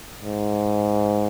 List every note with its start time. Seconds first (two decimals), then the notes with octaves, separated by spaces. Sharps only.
0.21 G#2